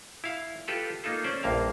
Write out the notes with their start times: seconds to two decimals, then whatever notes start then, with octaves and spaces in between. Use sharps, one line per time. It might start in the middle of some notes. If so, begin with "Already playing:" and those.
0.24 E4 F5
0.68 F4 G4 A4 B4
1.04 A#3 D#4 F4 A4
1.24 C#4 C5 D5
1.43 A#1 G2 A#3 F5